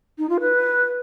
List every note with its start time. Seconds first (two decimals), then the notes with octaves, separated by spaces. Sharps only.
0.18 D#4
0.29 F4
0.41 B4